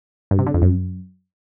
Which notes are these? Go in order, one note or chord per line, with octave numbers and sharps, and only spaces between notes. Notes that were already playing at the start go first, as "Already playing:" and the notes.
G2
C3
D3
F2
F#2